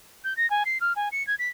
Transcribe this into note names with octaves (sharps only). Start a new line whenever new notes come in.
G6
A#6
G#5
C7
F6
G#5
C#7
G#6
B6